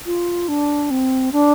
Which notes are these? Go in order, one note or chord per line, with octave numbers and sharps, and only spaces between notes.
F4
D4
C4
D4